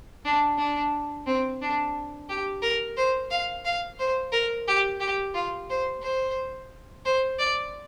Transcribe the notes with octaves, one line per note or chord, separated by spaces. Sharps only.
D4
D4
C4
D4
G4
A#4
C5
F5
F5
C5
A#4
G4
G4
F4
C5
C5
C5
D5